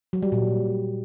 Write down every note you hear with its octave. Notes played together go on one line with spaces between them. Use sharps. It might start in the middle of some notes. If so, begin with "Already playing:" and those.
F#3
G3
A#2